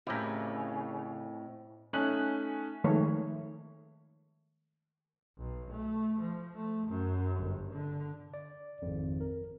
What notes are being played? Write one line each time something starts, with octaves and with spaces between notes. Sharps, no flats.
F2 A2 C#3 E4 G4 A#4
A3 C#4 D#4 G#5 F#6 F#7
D#3 F3 G#3 A3 A4 C#5
B1
A3
F3
A3
F#2
G1
D3
D5
G#1 F2
A#4